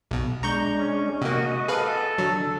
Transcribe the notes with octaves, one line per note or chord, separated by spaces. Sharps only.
B1 B2
G#3 D4 A#5 C#6 G6
C#4
C3 A#3 F#4 D#5
G#4 A4 B4 F5
D3 F#3